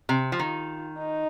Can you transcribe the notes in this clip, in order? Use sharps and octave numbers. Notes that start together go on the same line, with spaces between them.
C3
F3
D#3 F4
D#4